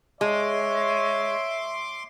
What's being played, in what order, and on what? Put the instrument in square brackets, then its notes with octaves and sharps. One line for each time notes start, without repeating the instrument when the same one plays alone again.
[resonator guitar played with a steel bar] G#3 [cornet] C#5 [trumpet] E5 [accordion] C6 D6